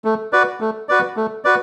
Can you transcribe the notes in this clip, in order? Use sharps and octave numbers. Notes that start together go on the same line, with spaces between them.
A3
F#4 B4 D5
A3
F#4 B4 D5
A3
F#4 B4 D5